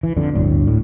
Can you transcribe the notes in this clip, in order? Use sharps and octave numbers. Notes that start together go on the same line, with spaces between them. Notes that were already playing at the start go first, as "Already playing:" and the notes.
E3
F2 D3
G1 D2 A2
A2